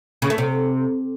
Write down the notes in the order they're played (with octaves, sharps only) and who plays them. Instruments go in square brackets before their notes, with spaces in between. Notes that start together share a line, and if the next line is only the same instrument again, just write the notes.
[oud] C#3
A3
C3